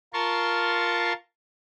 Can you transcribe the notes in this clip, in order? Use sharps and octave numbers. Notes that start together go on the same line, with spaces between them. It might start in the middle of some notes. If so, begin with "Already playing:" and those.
F4 A#4 A5 C6 C#6